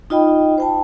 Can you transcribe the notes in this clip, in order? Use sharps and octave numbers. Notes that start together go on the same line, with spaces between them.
D#4 F4 D#5 G5 B5
C5 G5 A5